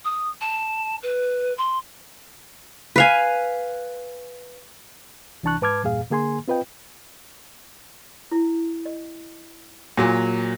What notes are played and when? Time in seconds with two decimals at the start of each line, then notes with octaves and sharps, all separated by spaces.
0.04 D#6
0.41 A5
1.03 B4
1.58 C6
2.96 B4 F5 G#5
5.43 C2 E3 D4 A5 C#6 F#6
5.62 G#2 B4 A5 D6 F6 G#6
5.83 E2 G2 A#2 G#4 F5
6.10 D3 A#3 G#4 G#5 C6
6.48 C4 F4 B4 D#5 G5
8.31 E4
8.86 D#5
9.98 A#2 F#3 F#4 G#4 G#5